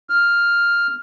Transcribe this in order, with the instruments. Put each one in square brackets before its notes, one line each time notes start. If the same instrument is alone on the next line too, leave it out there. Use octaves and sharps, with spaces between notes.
[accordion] F6